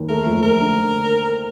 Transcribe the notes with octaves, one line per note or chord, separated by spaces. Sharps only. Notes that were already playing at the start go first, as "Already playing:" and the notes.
Already playing: D#2
A3 A#4
F2
A3 A#4
D3